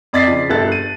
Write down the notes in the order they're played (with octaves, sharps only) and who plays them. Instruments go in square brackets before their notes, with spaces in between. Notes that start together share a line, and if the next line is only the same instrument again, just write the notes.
[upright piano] F2 D5 D#5 A6 B6 C7
C#3 F3
G1 G3 A4 E5 F#6 A6
F#6 D#7